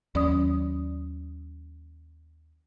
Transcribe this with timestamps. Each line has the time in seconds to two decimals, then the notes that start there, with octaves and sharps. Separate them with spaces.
0.15 D#2 F#3 C#4 D5 D#6